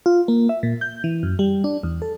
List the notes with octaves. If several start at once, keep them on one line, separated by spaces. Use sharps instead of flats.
F4
A#3
E5
A#2
G6
E3
F#2
G3
D4
E2
A4